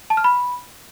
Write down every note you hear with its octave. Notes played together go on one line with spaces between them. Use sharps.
A5
F6
B5